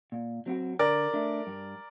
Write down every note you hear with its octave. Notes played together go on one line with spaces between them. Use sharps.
A#2
F#3 C4 F#4
D3 A#4 D5
A3 D4
G2